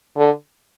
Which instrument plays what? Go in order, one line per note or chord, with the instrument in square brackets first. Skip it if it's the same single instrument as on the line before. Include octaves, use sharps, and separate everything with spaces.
[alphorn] D3